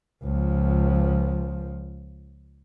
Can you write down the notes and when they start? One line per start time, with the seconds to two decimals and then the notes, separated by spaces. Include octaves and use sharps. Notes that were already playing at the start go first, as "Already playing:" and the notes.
0.24 C#2 F3